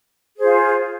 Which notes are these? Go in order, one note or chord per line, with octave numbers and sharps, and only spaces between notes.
F4 G#4 C5